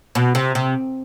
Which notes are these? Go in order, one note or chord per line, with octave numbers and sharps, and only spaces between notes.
B2
C3
C3